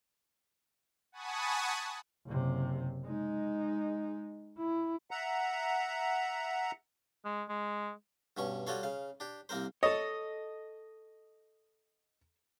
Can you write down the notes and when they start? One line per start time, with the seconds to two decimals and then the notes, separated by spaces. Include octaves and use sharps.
1.12 F#5 G#5 A5 B5 C#6 D#6
2.26 F#1 C3
3.06 G#3 D#4
4.57 E4
5.11 E5 F#5 A#5
7.25 G#3
7.49 G#3
8.37 G2 B2 C#4 C#6
8.67 G3 F4 F#4 A4 C#5 F5
8.83 C#3 F5
9.20 D4 G4
9.49 C2 A#3 C4 A#4 C5
9.83 A4 C#5 D#5